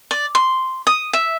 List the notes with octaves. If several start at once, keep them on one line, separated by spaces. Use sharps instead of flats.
D5
C6
D#6
E5